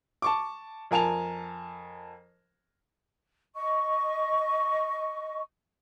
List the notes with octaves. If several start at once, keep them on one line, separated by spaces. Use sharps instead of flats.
A5 C#6 D6
F2 A#4 G#5 A5 F7
D#5 C#6